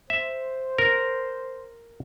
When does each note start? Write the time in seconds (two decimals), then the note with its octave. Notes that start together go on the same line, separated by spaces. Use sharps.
0.10 C5 E5
0.78 A#4